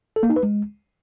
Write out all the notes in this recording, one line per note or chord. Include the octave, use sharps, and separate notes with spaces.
A4
A#3
D#4
B4
G#3